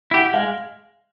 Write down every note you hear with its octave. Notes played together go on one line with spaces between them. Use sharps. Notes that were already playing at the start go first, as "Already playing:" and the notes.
E4 G4 F#5
G#3 F5